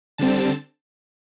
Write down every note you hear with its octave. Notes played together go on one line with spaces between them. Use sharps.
D3 G3 C4 A5